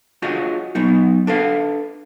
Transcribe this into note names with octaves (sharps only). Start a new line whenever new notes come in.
D4 F4 F#4 G#4 C#5 D#5
F#3 B3 D#4
D4 A4 B4 F5